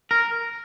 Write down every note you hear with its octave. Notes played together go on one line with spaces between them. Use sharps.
A#4